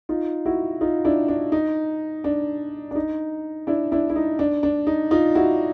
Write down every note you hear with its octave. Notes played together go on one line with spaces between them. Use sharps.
D#4 F4
E4 F#4
D#4 F4
D4 E4
D4
D#4
D4
D4
D#4
D4 E4
D4 E4
E4
D#4
D4
D4
D#4
D#4 F4
E4 F#4